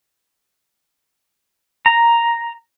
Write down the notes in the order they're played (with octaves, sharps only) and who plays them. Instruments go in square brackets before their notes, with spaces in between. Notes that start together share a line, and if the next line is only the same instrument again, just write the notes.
[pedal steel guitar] A#5